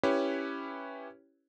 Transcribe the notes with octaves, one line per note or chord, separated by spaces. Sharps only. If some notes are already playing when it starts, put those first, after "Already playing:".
C#4 E4 G4 B4 C#5